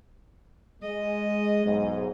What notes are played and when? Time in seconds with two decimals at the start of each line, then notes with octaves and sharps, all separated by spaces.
0.82 G#3 D#5
1.65 B1 G#2